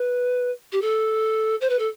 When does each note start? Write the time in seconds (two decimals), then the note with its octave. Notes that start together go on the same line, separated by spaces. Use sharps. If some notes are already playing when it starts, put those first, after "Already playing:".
Already playing: B4
0.72 G4
0.82 A4
1.61 C5
1.70 B4
1.79 A4